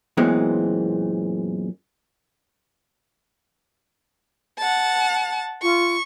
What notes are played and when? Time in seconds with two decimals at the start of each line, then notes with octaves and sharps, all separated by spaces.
0.17 F#2 A#2 E3 G#3 B3 C4
4.59 F#5 A5
5.63 F4 C#6